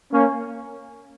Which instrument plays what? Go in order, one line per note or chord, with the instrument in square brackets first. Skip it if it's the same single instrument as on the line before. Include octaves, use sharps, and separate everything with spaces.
[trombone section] A#3 C#4